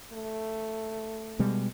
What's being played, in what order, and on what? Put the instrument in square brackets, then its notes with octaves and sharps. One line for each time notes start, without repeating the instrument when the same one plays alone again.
[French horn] A3
[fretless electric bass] B2 G3 G#3